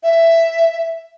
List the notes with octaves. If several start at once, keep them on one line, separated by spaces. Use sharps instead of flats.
E5